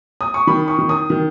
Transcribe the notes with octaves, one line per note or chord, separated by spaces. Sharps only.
D#6
C#6
D#3 B5
C#6
D#3
D#6
D#3